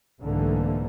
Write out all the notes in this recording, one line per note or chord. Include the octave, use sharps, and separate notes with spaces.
C2 G#2 D3 E3 A3 A#3